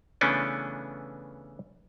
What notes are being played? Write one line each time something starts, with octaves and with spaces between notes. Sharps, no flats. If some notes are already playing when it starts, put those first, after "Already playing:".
C#3 E3 A3 B3 C#4 D4